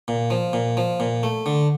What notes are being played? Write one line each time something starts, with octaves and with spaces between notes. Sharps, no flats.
A#2
F3
A#2
F3
A#2
A3
D3